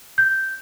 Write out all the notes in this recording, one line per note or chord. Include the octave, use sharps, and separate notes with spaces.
G6